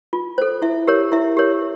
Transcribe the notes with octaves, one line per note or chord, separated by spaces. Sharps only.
F4
A4 C5
E4 E5
G4 A#4 C#5
E4 E5
G4 A#4 C#5